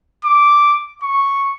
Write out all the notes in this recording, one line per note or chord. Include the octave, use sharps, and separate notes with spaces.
D6
C#6